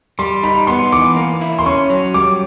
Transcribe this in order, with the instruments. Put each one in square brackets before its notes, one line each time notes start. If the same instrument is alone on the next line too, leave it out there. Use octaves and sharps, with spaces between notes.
[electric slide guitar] G3 [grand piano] C6
[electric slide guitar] D#4 [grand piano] B5
[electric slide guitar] B3 [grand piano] C6
[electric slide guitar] E3 [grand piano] D6
[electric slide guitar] A#3
E4
[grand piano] C6
[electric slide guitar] C#4 [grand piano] C#6
[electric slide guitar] F#3
[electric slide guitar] G3 [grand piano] D6